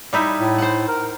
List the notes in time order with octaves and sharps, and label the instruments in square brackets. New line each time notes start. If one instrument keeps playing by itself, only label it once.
[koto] G3 D#4 E4
[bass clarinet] A2
[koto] C5 F#5
[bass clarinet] A#4